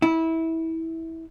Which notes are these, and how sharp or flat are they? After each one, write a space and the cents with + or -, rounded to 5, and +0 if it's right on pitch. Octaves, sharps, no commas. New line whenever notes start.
E4 -20